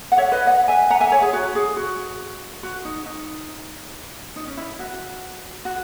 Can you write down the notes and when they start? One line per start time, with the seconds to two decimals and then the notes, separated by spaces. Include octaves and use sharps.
0.12 F#5
0.18 C#5 E5
0.32 B4 D#5
0.46 D#5 F#5
0.68 E5 G#5
0.90 F#5 A#5
1.00 E5 G#5
1.12 C#5 E5
1.22 G#4
1.33 F#4
1.55 G#4
1.77 F#4
2.63 F#4
2.85 D#4
3.06 D#4
4.36 D#4
4.47 C#4
4.57 E4
4.79 F#4
5.65 F#4